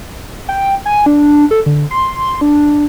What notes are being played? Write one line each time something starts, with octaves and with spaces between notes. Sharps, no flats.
G5
G#5
D4
A4
D3
C6
D4